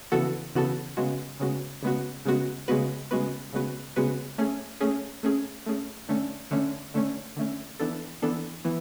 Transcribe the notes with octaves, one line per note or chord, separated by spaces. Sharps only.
C#3 E3 B3 F#4 A4
C#3 E3 B3 F#4 A4
C#3 G#3 B3 F#4
C#3 G#3 B3 F#4
C#3 G#3 B3 F#4
C#3 G#3 B3 F#4
C#3 G#3 B3 F#4 B4
C#3 G#3 B3 F#4 B4
C#3 G#3 B3 F#4 B4
C#3 G#3 B3 F#4 B4
A3 C#4 G#4
A3 C#4 G#4
A3 C#4 G#4
A3 C#4 G#4
D3 A3 C#4
D3 A3 C#4
D3 A3 C#4
D3 A3 C#4
E3 B3 D4 A4
E3 B3 D4 A4
E3 B3